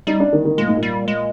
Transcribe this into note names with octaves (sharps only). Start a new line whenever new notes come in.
G3 D#4
D4
D#3
D#3
A#2 G#3
G#2
A#2
G3
G#3